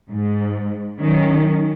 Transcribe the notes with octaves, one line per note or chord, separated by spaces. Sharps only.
G#2
D#3 F#3 C#4